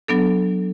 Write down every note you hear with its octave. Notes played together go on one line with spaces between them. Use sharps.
F#3 B3 D4 A4